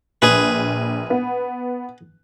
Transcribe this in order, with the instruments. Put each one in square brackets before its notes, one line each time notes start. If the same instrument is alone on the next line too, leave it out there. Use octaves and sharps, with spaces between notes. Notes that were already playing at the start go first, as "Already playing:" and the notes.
[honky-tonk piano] A#1 [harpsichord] G#4 B4
[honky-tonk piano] B3